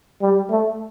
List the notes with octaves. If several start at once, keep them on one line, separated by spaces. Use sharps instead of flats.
G3
A3